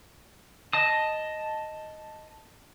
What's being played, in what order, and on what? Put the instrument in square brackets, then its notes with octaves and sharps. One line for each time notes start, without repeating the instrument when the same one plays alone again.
[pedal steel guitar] D#5 A5 D#6